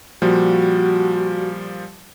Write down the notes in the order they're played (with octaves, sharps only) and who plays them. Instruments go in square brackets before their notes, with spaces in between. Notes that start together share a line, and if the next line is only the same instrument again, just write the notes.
[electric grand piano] A#2 F3 G3 [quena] F#4